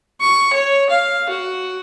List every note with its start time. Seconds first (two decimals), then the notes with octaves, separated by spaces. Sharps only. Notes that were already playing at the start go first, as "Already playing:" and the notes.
0.21 C#6
0.53 C#5
0.90 F5
1.29 F#4